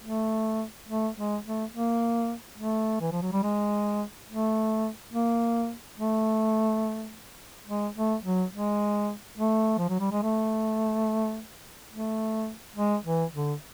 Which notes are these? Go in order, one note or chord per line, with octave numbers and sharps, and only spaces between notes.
A3
A3
G#3
A3
A#3
A3
E3
F3
F#3
G3
G#3
A3
A#3
A3
G#3
A3
F#3
G#3
A3
F3
F#3
G3
G#3
A3
A3
G#3
E3
D3